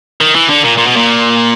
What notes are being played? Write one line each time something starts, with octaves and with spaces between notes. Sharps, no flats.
D#3
E3
D3
A#2
A#2
B2
A#2